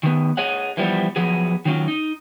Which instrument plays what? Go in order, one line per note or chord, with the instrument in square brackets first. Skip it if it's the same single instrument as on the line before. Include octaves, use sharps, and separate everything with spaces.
[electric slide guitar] D#3 B3
G#4 C#5 D#5 F#5
E3 F3 G3 B3
F3 F#3 B3 G#4
D#3 F#3 C#4 F4
D#4